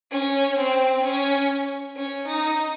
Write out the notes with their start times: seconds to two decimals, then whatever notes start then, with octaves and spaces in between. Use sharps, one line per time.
0.11 C#4
0.58 C4
1.04 C#4
1.96 C#4
2.26 D#4